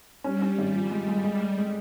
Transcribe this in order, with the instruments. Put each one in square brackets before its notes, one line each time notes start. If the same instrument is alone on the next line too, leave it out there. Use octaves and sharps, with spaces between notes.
[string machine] G3 [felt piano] C#4
[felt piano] C#4
G#1
F3
G#3
G#3
G#3
G#3
G#3